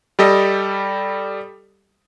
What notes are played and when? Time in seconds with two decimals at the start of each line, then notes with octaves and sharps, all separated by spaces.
0.19 G3 G4 A4 D#5